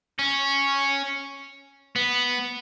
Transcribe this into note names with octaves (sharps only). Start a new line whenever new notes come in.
C#4
B3